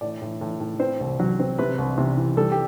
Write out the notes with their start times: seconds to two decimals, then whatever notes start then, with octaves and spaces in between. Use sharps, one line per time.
0.01 A2 D5
0.22 A2
0.41 A2
0.60 A2
0.80 C4 C5
1.00 C2
1.20 F#3
1.40 C4
1.58 C3 B4
1.78 C2
1.98 C3
2.17 E3
2.37 G3 A4
2.52 G4